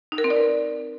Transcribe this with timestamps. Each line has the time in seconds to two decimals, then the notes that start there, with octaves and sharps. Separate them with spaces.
0.12 D#4
0.18 A#4
0.24 C4
0.30 D5
0.36 B4